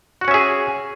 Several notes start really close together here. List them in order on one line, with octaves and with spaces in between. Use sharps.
F#4 F#5 C#4 E5 G#4